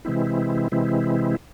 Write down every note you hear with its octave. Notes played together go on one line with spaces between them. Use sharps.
C3 E3 G#3 C4 E4
C3 E3 G#3 C4 E4